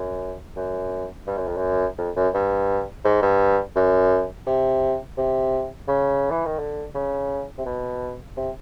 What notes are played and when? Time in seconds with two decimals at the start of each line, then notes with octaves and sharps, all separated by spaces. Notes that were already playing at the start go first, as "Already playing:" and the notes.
Already playing: F#2
0.56 F#2
1.27 G2
1.37 F#2
1.47 F2
1.57 F#2
1.98 F2
2.16 F#2
2.34 G2
3.04 G#2
3.22 G2
3.76 F#2
4.47 C3
5.17 C3
5.88 C#3
6.31 E3
6.45 D#3
6.59 D3
6.95 C#3
7.58 C3
7.66 B2
8.37 C3